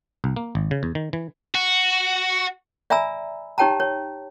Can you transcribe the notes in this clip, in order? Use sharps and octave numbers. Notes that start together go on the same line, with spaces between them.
C2
A#3
G#1
C#3
E2
D#3
E3
F#4
D5 E5 G#5 A#5 B5 E6
D#4 G4 C#5 G5 A5 A#5
C#5